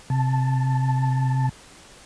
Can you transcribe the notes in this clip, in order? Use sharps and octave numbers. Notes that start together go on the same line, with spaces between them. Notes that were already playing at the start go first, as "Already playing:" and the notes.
C3 A5